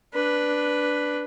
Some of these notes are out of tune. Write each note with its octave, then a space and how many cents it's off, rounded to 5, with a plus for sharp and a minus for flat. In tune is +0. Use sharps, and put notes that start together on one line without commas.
D4 +0 B4 +0